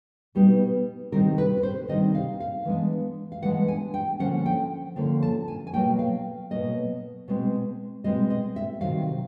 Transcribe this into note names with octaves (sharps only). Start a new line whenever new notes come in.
B2 G3 B3 D#4
C3 D#3 G3 C4 D#4 A#4
B4
B4
C5
C3 D#3 G3 C4 D#4 D#5
F5
F5
E3 G#3 B3 D4
F5
E3 G#3 B3 D4 F#5
G#5
G5
D3 F3 A#3 C#4 F#5
G5
D3 F3 A#3 C#4
A5
G#5
G#5
B2 F#3 A#3 G5
F5
B2 F#3 A#3 D#5
B2 G#3 C4
B2 G#3 C4 D#5
D#5
E5
C3 D#3 F#3 F5